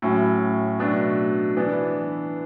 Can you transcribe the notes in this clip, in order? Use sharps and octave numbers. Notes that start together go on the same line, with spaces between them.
A2 F#3 C#4 E4
B2 F#3 A3 D4
E3 B3 D4